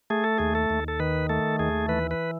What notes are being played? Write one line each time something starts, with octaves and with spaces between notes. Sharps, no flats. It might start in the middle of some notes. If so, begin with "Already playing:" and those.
A3 G#4
A4
D#2 G#4
A4
D#2
A4
D#3 B4
A3 A4
D#2 G#4
E3 B4
B4